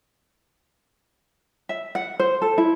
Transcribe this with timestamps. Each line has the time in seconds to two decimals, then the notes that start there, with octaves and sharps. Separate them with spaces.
1.69 E5
1.95 F#5
2.19 C5
2.42 A4
2.58 E4